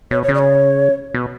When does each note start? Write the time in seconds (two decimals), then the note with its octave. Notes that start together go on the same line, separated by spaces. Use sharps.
0.11 B2 C#5
0.23 C#5
0.28 C#3
0.34 D5
0.39 C#5
1.14 B2